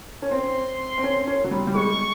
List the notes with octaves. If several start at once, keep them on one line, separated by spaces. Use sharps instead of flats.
C#4
C4 C6
C4
C#4
C#4
F#3
G3
G3
G#3 C#6